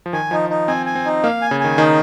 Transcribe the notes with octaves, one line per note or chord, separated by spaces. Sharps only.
F3
D#3 G#5
F3 D#4
D#4
C4 G#5
G#5
C4
D#4
A#3 F5
G#5
C#3
D#3 G#5
D#3 D#4